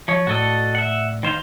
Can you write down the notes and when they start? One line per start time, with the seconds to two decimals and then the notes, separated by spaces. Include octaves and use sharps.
0.08 F3 C#5
0.27 A2 A3 F#4 A4 D5 D#5
0.75 E5 F#5
1.23 D#3 C5 F5